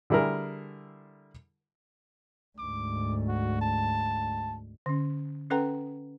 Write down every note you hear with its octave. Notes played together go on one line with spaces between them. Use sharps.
D3 G3 E4 G#4 A#4
D2 G#2 D6
F#4
A5
D3 C#4
C#4 A4 B4 F#5 G5 A#5